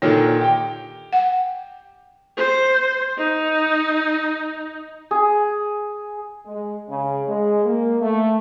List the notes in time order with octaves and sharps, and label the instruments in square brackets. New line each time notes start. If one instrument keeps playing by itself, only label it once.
[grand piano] A#2 D3 D#3 [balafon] C#5
[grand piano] G4 G5
[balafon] F#5
[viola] C5
D#4
[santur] G#4
[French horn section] G#3
C#3
G#3
A#3
A3